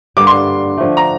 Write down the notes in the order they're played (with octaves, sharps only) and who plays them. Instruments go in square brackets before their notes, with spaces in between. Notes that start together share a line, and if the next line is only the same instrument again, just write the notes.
[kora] G2 D3 G3 A#3 [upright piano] D6
[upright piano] C6
[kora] D3 F3 A3
[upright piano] A#5